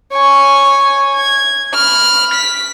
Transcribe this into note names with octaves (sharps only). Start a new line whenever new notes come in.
C#5 G#5
G#6
B5 F6
B6